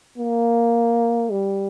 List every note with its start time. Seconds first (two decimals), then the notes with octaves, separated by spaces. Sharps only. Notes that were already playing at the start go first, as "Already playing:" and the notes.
0.18 A#3
1.31 G3